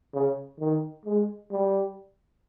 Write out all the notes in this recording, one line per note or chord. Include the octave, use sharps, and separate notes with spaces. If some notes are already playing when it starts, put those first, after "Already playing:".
C#3
D#3
G#3
G3